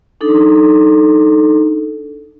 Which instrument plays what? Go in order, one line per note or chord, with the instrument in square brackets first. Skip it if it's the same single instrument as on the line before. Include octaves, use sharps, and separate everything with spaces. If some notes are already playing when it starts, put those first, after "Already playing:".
[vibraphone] D4 D#4 A4